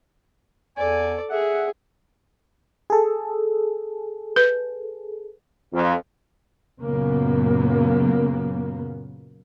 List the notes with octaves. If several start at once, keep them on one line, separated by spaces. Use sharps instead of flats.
E2 A4 D5 G#5
G#4 E5 F#5
G#4 A4
B4
F2
F#2 A#2 C#3 A#3 B3